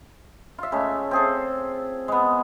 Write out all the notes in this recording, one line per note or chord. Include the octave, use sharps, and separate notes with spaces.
F4 E5
C#3 G#3 A3
C4 G#4 A4
G#3 B3